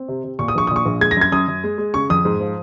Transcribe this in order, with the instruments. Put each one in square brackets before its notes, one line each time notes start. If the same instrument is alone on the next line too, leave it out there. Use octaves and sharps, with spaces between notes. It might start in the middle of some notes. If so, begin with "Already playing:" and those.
Already playing: [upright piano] C4
C3
C3
A#2 C#6
D#6
A#1 C#6
A#2 D#6
C#6
A#1
G#3 G#6
A#6
F#2 G#6
F#2 D#6
F#2
G#3
G#3
C#3 C#6
F2 D#6
G#2
F3